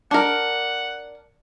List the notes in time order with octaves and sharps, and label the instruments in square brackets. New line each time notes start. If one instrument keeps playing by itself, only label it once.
[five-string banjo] D4 A#4 [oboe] F#5